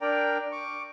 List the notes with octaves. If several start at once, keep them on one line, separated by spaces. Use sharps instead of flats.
D4 A#4 D5 G5 A#5
C#6 D6